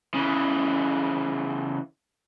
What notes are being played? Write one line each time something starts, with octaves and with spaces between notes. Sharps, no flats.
C#3 E3